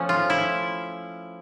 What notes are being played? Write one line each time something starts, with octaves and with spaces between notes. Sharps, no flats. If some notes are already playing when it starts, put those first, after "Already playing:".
Already playing: F3 A3 C#4
F4
E4